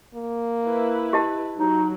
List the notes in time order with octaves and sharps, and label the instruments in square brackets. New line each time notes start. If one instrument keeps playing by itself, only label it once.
[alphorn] A#3
[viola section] E4 B4
[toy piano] G4 D#5 A5
[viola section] F#3 [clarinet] D#4